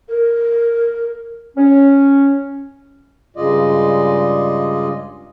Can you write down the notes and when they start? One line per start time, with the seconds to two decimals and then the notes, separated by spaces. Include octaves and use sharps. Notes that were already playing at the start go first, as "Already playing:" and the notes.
0.08 A#4
1.56 C#4
3.36 G2 C#3 G#3 F4 D5 D#5